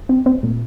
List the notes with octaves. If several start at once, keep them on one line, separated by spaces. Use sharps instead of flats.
C4
C4
A#2